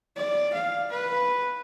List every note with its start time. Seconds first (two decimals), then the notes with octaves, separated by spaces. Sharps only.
0.16 D5
0.54 F5
0.90 B4